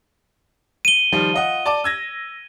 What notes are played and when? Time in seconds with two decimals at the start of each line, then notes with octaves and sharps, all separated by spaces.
0.85 D#7 G7
1.12 D#3 F3 G3
1.34 F4 D#5 F#5
1.66 D5 A5 D6
1.84 E6 G#6 A#6